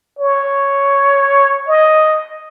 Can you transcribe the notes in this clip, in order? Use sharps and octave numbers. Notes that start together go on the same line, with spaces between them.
C#5
D#5